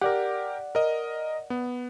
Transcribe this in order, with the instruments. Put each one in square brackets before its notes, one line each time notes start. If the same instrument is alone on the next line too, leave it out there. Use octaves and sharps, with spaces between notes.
[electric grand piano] G4 A#4 [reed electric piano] D5 F#5
[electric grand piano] A#4 D#5
B3